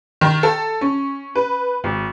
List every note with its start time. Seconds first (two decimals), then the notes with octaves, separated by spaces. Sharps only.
0.21 D#3
0.43 A4
0.81 C#4
1.35 B4
1.84 G#1